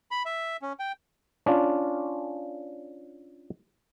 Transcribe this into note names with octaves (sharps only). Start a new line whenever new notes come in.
B5
E5
C#4
G5
C#4 D4 F4